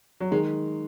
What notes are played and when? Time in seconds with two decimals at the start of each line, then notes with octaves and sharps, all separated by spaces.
0.20 F#3
0.31 D#3 G#3